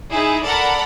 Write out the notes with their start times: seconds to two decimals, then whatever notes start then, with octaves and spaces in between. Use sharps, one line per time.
0.11 D#4 E4 G#4
0.44 A4 A#4 D5 F#5 A5 B5